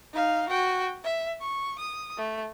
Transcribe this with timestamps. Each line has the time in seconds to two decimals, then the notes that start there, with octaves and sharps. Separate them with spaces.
0.14 D#4 F5
0.49 F#4 G5
1.04 E5
1.41 C#6
1.79 D#6
2.18 A3